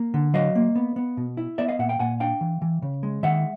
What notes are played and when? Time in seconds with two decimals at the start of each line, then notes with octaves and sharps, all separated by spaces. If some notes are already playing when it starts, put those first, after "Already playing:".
Already playing: A#3
0.14 D3
0.34 F#3 D#5 F5
0.55 A#3
0.76 B3
0.96 B3
1.17 B2
1.37 E4
1.58 B3 D5 E5
1.68 D#5 F5
1.79 A#2 E5 F#5
1.89 F5 G5
1.99 A#2 F#5 G#5
2.20 D4 F5 G5
2.41 E3
2.62 E3
2.82 C#3
3.03 G#3
3.23 D#3 E5 F#5